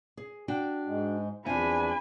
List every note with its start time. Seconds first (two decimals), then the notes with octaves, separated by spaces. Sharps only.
0.17 G#4
0.48 D4 F#4 G5
0.87 G#2 G#3
1.46 E2 C4 D4 F4 G#5 B5